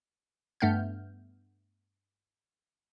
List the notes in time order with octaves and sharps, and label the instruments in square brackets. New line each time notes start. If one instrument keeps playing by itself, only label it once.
[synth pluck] G2 A3 B3 F6 G6